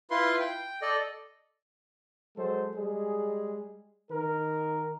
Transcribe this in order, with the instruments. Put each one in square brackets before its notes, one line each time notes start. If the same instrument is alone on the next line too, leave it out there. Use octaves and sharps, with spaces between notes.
[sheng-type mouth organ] E4 F4 B4 C6
G5
A4 D5 D#5
[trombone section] F#3 G#3 A4 C5
G3 G#3 G#4
D#3 A#4